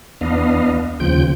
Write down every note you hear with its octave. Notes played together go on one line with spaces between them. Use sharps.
E2 B3 D4 D#5 F5
D#2 C#3 F3 G5 G6